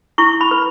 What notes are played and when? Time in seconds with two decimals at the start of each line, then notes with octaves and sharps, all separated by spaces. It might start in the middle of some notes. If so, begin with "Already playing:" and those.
0.18 E4 C#6
0.41 B5
0.51 B4